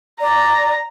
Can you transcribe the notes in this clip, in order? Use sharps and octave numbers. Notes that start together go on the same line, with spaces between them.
D5 A#5